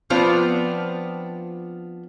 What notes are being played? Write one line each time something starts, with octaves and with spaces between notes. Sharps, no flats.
F3 B3 C4 D4 F4